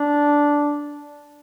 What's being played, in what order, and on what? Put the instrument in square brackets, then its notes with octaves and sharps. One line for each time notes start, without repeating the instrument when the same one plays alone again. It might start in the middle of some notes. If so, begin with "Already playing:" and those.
Already playing: [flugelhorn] D4